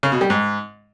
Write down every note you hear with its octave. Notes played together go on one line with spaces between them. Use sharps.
C#3
B2
G3
G#2